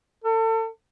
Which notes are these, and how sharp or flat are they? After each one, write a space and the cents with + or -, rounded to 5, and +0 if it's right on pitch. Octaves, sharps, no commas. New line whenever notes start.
A4 +35